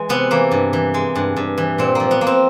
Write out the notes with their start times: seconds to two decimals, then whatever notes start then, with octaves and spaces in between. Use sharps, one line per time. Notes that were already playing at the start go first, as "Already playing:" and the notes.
Already playing: E3 G#3
0.09 C3 B3
0.31 E3 A#3
0.52 G2
0.73 E3
0.94 G#3
1.16 G2
1.37 G2
1.58 E3
1.78 A#2 C4
1.95 F3 A#3
2.11 B3
2.21 A#3
2.27 C4